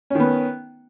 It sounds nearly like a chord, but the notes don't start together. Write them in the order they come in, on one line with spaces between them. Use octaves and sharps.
C#4 D#3 B3